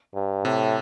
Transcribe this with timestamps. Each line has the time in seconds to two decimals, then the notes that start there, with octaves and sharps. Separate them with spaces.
0.14 G2
0.45 A2 C3